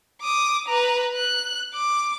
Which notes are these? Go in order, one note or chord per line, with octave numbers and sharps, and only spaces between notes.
D6 D#6
B4 A#5
F#6
D6